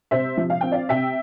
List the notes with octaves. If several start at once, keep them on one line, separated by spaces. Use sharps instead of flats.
C3 C5 E5
F3
F5
C4 G5
D5 F5
C3 E5 G5